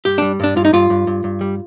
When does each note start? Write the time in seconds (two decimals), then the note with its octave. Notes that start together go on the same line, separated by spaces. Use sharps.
0.05 G2 G4
0.18 G3 D4
0.40 G2 D4
0.56 G2 F4
0.65 D#4
0.73 G2 F4
0.90 G2
1.07 G2
1.24 G2
1.41 G3